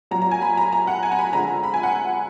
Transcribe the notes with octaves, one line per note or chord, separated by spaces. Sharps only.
A#2 F#3 A#5
A#5
G#5
B5
A#5
A#5
F#5
G#5
A#5
B5
D3 F3 G#3 A#5
B5
G#5
F#5